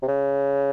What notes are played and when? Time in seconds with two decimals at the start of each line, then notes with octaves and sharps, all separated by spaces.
0.03 C3
0.08 C#3